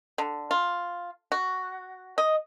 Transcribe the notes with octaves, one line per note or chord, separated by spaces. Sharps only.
D3
F4
F#4
D#5